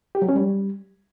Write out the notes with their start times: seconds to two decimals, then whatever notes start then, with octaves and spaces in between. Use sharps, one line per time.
0.15 G4
0.22 F#3
0.29 C#4
0.35 G3